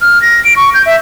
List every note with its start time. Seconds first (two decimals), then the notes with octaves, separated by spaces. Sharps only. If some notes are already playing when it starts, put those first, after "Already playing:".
0.01 F6
0.22 A#6
0.44 D7
0.56 C#6
0.74 G6
0.86 E5